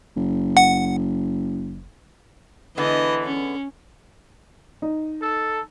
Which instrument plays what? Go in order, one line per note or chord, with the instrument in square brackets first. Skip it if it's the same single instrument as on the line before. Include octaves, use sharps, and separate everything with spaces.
[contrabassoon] F#1
[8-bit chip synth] F#5
[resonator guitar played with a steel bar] D3 G#3 B3 [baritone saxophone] E3 [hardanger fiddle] D#5
[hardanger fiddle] C#4
[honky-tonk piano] D#4
[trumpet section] A4